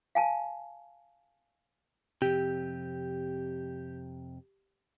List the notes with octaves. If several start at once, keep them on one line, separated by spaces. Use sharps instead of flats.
F5 G#5 A5
F2 C3 G4